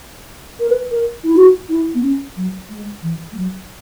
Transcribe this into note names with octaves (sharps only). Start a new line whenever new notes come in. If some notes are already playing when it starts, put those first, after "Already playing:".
A#4
B4
A#4
E4
F#4
E4
B3
C#4
F#3
G#3
E3
G#3
F#3